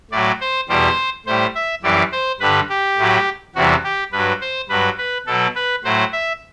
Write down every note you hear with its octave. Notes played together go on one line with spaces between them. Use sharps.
A2 F#3 D5
C5
E2 B2 G3 C5
A2 G3 C5
E5
F#2 E3 G3 D5
C5
G2 D3 G3 B4
G4
A2 F#3
E2 C3 E3 G3 F#4
G4
G2 F#3 B4
C5
G2 F#3 B4
B4
B2 F#3 A4
B4
A2 F#3 C5
E5